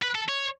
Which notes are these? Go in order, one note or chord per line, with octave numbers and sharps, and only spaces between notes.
B4
A4
C#5